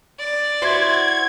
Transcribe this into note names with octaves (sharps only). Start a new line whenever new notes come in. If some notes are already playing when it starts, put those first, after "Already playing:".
D5
E4 F#4 C5 G#6